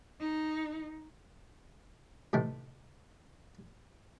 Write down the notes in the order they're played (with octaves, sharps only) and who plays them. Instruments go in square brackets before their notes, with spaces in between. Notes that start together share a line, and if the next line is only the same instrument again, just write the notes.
[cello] D#4
[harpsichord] A2 C3 D#3 E3 A3